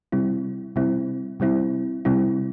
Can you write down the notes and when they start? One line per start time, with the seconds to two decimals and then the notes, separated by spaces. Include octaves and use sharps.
0.12 C3 G3 C4 E4
0.76 C3 G3 C4 E4
1.40 C3 G3 C4 E4
2.05 C3 G3 C4 E4